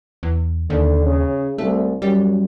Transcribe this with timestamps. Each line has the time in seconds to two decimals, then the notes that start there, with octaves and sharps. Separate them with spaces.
0.23 E2
0.70 D#2 D3
1.05 C#3
1.58 C2 A3
2.02 F#2 G3